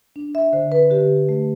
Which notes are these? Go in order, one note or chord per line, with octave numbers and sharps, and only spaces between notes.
D4
E5
D3 C5
B4
D3 G4
A3